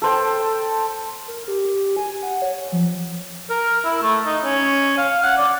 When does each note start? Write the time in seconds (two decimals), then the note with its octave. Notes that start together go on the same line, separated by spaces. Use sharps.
0.02 A4 C5 G5
1.28 A#4
1.48 G4
1.97 G#5
2.23 F#5
2.42 C#5
2.72 F3
3.50 A#4
3.85 E4
4.02 A3
4.26 D#4
4.44 C#4
4.98 F5
5.23 F#5
5.37 D5